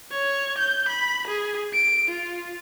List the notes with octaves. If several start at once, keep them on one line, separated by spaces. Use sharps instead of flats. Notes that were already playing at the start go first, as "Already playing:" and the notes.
C#5
G6
B5
G#4
D7
F4